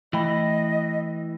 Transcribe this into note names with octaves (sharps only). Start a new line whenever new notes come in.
E3 A3 D#5 G5 B5